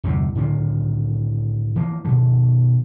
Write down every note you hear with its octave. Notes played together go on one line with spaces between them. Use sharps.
G1 E2 C3
A2 D3 D#3 F3
E3 F3 A#3
B2 D#3 F3